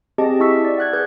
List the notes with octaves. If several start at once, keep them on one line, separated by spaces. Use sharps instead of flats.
C4 G4 G#4 D#5 A5
E4 C#6 E6 B6
D5
F#5 F#6 G#6
G#4 B4 G6 G#6